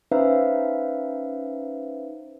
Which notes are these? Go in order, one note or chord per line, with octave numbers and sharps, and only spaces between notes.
C#4 D#4 B4 C5 E5 F5